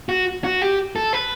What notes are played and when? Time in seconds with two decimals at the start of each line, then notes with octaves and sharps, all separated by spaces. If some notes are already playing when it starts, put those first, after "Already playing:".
0.09 F#4
0.44 F#4
0.62 G4
0.96 A4
1.13 B4